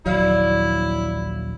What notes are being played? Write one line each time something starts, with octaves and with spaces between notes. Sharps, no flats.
A#1 D#2 F#3 E4 C#5 D5 F5